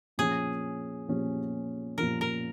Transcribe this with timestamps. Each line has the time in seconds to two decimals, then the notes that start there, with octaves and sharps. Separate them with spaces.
0.18 A#2 F3 C#4 G#4
1.08 A#2 F3 C#4
1.98 A#2 F3 C#4 A#4
2.21 A#4